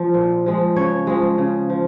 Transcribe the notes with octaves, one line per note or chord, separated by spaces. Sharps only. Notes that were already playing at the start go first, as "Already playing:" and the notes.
Already playing: F3
A#2
F3 G#3
C#3 C#5
F3 G#3
C#3
F3